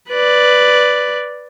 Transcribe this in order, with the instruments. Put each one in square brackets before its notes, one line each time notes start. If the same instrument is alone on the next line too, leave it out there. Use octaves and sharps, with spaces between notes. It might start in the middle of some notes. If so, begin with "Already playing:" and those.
[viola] B4 D5